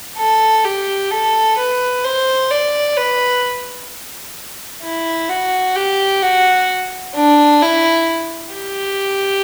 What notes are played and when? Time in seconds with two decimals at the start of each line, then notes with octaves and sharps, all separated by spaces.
0.18 A4
0.65 G4
1.11 A4
1.58 B4
2.04 C5
2.51 D5
2.97 B4
4.83 E4
5.29 F#4
5.76 G4
6.22 F#4
7.15 D4
7.62 E4
8.54 G4